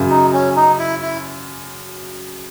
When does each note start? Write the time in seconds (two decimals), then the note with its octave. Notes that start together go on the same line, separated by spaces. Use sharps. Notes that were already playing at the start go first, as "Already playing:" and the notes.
Already playing: F#2 C#3 F#3
0.10 D#4
0.33 C#4
0.56 D#4
0.79 E4
1.02 E4